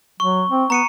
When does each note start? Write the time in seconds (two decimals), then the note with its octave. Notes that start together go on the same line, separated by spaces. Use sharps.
0.20 F#3 C#6
0.50 C4
0.70 B3 A#5 C#7 D#7